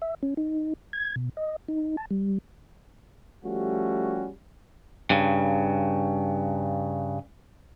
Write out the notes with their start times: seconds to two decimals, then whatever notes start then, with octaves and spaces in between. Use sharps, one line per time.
0.02 E5
0.23 C#4
0.37 D#4
0.93 G#6
1.16 B2
1.37 D#5
1.68 D#4
1.97 A5
2.11 G3
3.44 F3 G3 A3 C#4 F#4 G4
5.10 G2 C#3